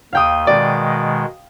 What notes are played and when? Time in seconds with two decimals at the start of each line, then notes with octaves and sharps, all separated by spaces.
0.13 D#2 F5 G5 D#6
0.47 B2 D#3 G#3 D5